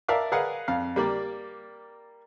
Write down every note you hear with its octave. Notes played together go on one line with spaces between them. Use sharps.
A#4 D5 E5 F5 A5 D6
G#4 A#4 B4 F5 F#5
F2 F5
G3 A#3 D5